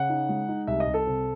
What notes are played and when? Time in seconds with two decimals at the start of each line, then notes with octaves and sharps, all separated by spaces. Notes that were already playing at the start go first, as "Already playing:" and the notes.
Already playing: C#3 F#5
0.09 D#4
0.29 G#3
0.48 D#4
0.67 C2 E5
0.80 D#5
0.87 C2
0.94 A4
1.07 C3